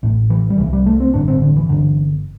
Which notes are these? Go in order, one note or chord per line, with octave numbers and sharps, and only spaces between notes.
A1 A2
E3
G3
C2 C3 E3
G3
A3
C4
A1 G2 D3 D4
C4
D3
E3
G1 G2 D3